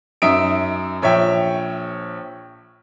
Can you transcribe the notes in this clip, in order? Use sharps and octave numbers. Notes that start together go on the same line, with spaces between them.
F#2 D#4 D#5 E5 D7
A#1 C#5 E5 G5